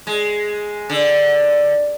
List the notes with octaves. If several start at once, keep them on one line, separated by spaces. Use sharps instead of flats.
G#3
D3